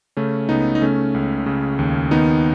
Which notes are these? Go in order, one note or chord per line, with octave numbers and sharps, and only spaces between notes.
C#3 A3 C#4
C#2 B3 D#4
D#4
C#3 A3 C#4
C#2
C#3
D#2
D#3 B3 D#4